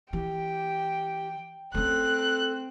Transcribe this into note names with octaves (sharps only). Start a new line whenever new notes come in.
E3 G4 G5
A3 C4 C#4 A4 F#6